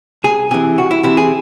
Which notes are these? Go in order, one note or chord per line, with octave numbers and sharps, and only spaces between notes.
C2 G#4
C3 E3 G#4
C2 F#4
E4
C3 E3 E4
G#4